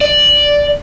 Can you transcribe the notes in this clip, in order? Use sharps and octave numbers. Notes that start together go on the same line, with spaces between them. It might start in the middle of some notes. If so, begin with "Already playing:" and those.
D5